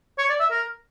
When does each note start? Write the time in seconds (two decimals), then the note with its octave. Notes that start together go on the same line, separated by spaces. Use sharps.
0.18 C#5
0.29 D5
0.40 E5
0.51 A#4